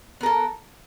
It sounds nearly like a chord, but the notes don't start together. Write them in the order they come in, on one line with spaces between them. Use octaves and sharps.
B3 A#4 A4